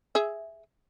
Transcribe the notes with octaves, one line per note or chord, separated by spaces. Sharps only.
G#4 E5